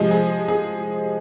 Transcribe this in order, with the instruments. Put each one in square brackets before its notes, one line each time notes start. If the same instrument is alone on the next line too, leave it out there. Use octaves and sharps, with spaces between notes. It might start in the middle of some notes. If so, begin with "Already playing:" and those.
Already playing: [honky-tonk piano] C3 F3 G#3
G#4
G#4